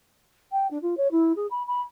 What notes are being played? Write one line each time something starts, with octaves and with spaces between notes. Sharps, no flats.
G5
D4
F4
C#5
E4
G#4
B5
B5